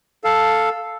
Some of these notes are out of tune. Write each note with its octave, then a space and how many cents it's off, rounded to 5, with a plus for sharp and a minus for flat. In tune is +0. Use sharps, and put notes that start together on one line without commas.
A4 +0 F5 +0